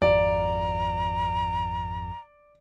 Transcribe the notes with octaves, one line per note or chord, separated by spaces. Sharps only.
G#1 F2 D5 A#5